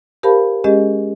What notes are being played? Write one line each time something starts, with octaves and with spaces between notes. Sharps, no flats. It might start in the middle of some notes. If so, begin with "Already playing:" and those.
G4 A#4 C5 F5 A5 B5
G#3 C#4 G4 G#4 D#5